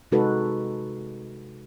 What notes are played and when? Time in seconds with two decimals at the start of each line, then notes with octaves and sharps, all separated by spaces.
0.12 C3 G#3 D#4 F#4 A4 B4